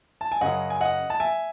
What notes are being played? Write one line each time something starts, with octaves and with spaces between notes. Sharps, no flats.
A5
G#5
F#2 C#3 F#3 D#5 F#5
G#5
D#5 F#5
A5
E5 G#5